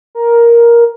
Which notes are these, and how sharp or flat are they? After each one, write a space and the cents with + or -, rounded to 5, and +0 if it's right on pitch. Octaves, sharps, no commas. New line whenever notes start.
A#4 +10